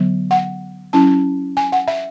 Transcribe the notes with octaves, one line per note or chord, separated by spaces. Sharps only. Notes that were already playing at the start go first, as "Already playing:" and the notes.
Already playing: D3 F#3 B3
F#5
F#3 C#4 E4 A5
G#5
F#5
E5